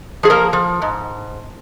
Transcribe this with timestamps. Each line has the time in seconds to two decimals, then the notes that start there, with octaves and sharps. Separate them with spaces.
0.23 F3 G#4
0.30 A#3 A#4
0.53 F3
0.82 G#2